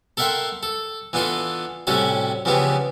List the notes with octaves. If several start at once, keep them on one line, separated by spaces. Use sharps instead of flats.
A4 A#4 E5 F#5 G5 C6
A4
E3 B3 D4 F4 A4
A2 C3 G3 C#4 F#4 A4
C#3 E3 F3 B3 D4 G4